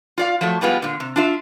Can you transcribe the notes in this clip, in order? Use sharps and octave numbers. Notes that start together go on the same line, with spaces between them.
F4 D5 F5
F3 F#3 A3
G3 G#3 B3 F4
A#2 D3
C3
D4 F4 E5